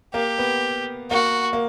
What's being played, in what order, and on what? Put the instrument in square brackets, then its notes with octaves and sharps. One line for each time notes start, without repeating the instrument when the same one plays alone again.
[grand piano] A#3 [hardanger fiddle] G4
[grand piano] B3
[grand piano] A#3 [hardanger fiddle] F#4
[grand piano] A#3